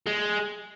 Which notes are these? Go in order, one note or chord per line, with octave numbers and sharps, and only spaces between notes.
G#3